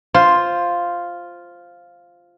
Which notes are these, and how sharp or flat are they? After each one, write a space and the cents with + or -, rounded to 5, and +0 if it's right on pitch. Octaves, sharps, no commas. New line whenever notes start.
F4 +0 C5 +5